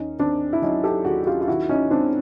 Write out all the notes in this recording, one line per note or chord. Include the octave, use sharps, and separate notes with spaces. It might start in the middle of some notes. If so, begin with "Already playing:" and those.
Already playing: D#2 C#4 D#4
D#2 C4 D4
E4
F#3 C#4 D#4
G4 A4
D#2 F#4 G#4
F#4
F4 G4
F4
D#3 E4 F#4
C#4 D#4
G#2 C4 D4